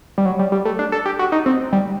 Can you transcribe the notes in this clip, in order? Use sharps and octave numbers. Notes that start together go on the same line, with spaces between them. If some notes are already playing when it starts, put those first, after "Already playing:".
G3
F#3
G3
G3
A3
D4
A4
G4
F#4
D#4
C4
G3